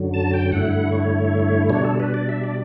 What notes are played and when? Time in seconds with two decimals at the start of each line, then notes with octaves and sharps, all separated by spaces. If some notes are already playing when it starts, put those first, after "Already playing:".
Already playing: F#2 D3 F#3
0.14 A5
0.33 G5
0.52 G2 D3 A3 E4 F#5
0.72 F#5
0.92 C#5
1.69 B2 G3 D4 C#5
1.85 A4
2.00 B4
2.14 D5
2.29 E5
2.44 D5